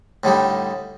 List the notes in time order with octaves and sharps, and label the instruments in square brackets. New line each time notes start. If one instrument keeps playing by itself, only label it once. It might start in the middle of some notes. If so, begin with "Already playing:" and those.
[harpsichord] A2 D3 G3 D#4